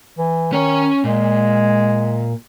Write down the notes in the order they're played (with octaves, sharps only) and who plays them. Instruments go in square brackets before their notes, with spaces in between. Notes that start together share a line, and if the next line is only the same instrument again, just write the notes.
[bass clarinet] E3
[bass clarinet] D#3 [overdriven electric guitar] C#4 C#5
[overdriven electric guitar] A#2 [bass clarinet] G#3